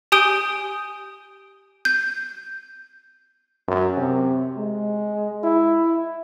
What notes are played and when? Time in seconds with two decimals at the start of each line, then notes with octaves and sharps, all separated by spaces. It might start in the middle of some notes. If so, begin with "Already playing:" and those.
0.12 G4 G#5 D#6 G6 D7 G7
1.85 G6
3.68 F#2
3.98 C3
4.57 G#3
5.44 E4